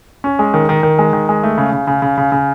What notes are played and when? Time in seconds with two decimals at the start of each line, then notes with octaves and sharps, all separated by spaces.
0.24 C#4
0.39 G#3
0.54 D#3
0.69 D#3
0.83 D#3
0.99 G#3
1.13 D#3
1.29 G#3
1.43 A3
1.58 C#3
1.72 C#3
1.87 C#3
2.02 C#3
2.18 C#3
2.32 C#3